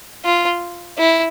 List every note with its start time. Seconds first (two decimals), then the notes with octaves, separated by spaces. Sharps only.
0.25 F4
0.98 E4